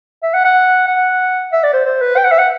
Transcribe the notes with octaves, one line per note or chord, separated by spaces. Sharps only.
E5
F#5
F#5
F#5
E5
D5
C5
C5
B4
G5
F#5
E5
F#5